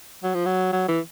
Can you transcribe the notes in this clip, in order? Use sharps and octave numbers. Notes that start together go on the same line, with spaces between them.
F#3
F3
F#3
F#3
E3